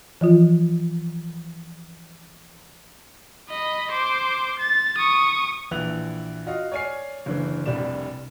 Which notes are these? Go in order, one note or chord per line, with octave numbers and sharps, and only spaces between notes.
E3 F3 F4
D#5 B5
C5 D6
A6
C#6 D#6
A#1 E3 E4 F#6 F7 F#7
F4 F#4 D#5 F5
C#5 D5 G#5 F6 C7
F#1 D3 E3
F1 C2 G3 D4 D5 E7